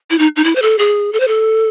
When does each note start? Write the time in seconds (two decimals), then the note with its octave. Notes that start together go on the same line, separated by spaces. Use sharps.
0.10 E4
0.19 D#4
0.36 D#4
0.44 E4
0.56 C5
0.62 A4
0.78 G#4
1.13 A4
1.20 C5
1.28 A4